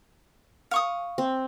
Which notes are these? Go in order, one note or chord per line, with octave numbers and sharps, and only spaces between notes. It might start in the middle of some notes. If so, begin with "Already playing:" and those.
F5 C#6 D#6
C4